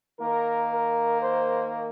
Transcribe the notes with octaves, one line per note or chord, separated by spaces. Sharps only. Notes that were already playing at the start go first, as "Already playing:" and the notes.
D#3 A#3 A#4
A#4
C5